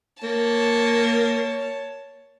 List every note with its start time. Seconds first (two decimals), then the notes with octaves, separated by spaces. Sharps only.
0.23 A#3 C#5 A5